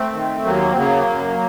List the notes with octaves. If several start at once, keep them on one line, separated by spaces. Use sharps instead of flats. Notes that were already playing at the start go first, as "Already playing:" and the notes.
Already playing: A3 C4
D#3
D#2 F#3 A#3
C4
C#3 F#3 A#3
F#2